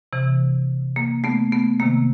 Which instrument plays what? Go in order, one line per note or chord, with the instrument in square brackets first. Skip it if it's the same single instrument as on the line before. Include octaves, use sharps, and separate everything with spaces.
[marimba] C3 E3
A#3
A3 B3
A3 B3
C3 D#3 A#3